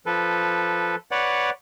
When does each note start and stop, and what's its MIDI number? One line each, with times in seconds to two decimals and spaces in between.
0.06 0.96 53
0.06 0.96 69
0.06 0.96 71
1.11 1.50 71
1.11 1.50 73
1.11 1.50 74
1.11 1.50 78